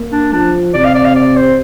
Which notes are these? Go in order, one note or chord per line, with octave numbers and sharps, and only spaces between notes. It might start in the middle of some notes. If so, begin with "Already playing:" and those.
Already playing: A#3
D4
F3 D4
C3 D5
F5
D5
F5
D5
C5